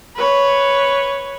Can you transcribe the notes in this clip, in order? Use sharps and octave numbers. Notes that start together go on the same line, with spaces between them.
B4 C#5